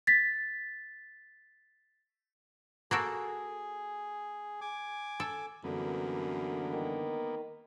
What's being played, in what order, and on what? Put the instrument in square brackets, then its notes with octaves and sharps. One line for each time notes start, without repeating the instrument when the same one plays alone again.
[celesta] A6 B6
[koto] A#3 F#4 A4 [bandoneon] G#4
[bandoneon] G#5 D6
[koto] A4
[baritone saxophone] F#2 [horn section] D3 E3 G3 [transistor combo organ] A#3 B3
[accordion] D#3